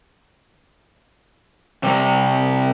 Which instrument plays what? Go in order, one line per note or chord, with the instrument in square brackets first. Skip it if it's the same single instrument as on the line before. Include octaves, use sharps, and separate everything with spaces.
[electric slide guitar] C3 G3